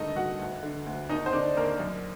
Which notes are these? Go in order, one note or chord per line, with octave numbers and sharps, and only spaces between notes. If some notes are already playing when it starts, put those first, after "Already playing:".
Already playing: G2 D3 A3 D#4 A4 D#5
G2 F#4 F#5
D2
D3
D2
D#2 D#4 D#5
C5
D3 D4 D5
D#2 A#3 A#4
F#2